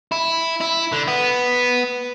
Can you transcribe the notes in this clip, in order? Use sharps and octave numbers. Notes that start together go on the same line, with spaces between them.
E4
E4
D3
B3